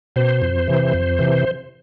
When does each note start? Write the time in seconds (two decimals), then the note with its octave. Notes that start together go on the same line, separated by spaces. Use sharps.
0.16 B2 C5
0.42 F2
0.68 C3 E3
0.94 F2
1.19 C3 E3